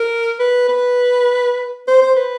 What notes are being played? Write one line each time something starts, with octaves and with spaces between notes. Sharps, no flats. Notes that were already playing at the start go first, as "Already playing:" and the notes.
Already playing: A#4
B4
B4
C5
C5
B4